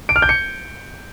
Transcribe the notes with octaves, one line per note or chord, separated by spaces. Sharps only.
D7
F6
G6
C#7